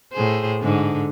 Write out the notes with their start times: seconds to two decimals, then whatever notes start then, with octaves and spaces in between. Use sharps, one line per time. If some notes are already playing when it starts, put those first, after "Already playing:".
0.13 A2 G#4 C5
0.61 G#2 D3